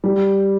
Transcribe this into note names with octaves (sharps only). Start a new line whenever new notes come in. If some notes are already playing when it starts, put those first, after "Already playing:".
G3